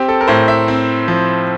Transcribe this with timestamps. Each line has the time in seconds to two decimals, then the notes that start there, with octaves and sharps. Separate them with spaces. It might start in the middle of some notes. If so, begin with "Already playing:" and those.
Already playing: C4 G4
0.08 A4
0.21 A#4
0.28 A2 C5
0.48 E5
0.68 C4
1.08 F3